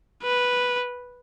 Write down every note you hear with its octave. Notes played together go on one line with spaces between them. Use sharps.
B4